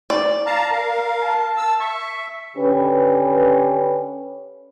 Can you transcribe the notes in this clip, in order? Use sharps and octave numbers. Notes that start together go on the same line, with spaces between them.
D5
F5 A5 A#5
A#4 F5
A5
E6
E5 C#6
D3 C#4 G4 B4